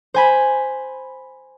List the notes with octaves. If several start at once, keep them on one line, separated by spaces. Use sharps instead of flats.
C5 G#5 B5